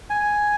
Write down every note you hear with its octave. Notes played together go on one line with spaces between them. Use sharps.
G#5